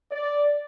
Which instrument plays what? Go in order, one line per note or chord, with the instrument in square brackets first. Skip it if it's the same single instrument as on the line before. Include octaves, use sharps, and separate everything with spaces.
[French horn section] D5